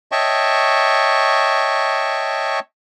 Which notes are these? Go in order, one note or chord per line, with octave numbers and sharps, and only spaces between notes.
C#5 D#5 E5 G5 A5 C#6